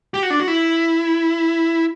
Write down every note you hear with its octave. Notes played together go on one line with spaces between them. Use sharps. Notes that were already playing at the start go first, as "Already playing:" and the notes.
G4
F#4
D4
F#4
E4